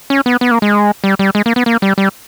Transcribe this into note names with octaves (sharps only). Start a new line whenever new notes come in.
C#4
B3
B3
A#3
G#3
G3
G3
G#3
A#3
B3
A#3
G3
G3